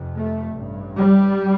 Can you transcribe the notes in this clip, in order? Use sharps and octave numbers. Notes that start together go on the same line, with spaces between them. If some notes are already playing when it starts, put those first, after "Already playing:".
Already playing: F1 F2 C3
A3
A1 G2
G3